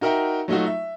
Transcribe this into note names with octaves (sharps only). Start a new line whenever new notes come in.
D#4 F#4 A#4 E5 F#5 G5
F#3 A3 D#4 F4 F#4
E5